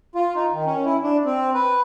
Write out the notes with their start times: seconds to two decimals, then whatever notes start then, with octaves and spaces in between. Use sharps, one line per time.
0.15 F4
0.36 D#4
0.53 D#3
0.66 C#4
0.85 E4
1.03 D4
1.25 C4
1.54 B4